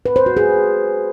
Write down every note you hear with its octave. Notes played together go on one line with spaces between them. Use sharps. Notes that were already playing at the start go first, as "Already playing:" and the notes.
B4
C5
F#4
G#4